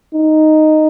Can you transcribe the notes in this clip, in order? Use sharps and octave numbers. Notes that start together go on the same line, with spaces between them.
D#4